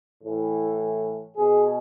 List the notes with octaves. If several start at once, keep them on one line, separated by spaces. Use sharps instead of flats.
A2 E3
B2 G#4